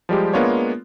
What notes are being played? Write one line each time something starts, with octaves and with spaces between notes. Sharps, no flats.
F3 G3 G#3 G4
G#3 A#3 B3 D4 F4 C#5